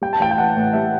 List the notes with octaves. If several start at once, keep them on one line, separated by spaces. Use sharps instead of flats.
G3 G5
A5
A1 G5
G5
E3 F#5
A2
G3 E5